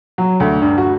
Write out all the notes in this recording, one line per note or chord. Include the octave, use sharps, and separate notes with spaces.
F#3
D2
G2
F#4